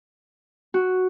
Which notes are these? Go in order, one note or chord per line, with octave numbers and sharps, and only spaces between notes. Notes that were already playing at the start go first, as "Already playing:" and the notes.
F#4